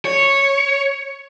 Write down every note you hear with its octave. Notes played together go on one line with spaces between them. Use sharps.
C#5